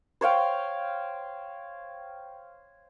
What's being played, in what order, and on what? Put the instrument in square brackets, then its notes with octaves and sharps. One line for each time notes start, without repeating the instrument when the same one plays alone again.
[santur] C5 C#5 F5 G5